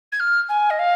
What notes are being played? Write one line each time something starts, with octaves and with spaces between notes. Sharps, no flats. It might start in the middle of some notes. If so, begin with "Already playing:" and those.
G#6
F6
G#5
D#5
F5